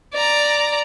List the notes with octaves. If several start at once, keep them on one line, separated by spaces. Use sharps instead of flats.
D5 A#5